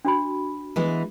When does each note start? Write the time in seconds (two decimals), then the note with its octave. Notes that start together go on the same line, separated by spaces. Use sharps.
0.05 D4 F#4 B5
0.76 E3 G#3 B3